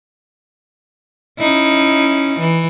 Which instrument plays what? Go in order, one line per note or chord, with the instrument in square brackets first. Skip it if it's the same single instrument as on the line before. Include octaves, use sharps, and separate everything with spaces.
[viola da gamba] C#4 D#4 E4
E3